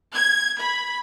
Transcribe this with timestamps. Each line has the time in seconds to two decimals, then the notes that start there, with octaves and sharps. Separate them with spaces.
0.14 G#6
0.60 B5